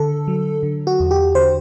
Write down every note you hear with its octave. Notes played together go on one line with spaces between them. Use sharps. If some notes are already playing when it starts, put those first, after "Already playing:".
Already playing: D3 A4
F#3
D3
F#4
E2
G4
D3 C5